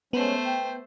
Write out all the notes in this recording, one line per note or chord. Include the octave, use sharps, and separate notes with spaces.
G#3 A3 B3 C#4 C5
G5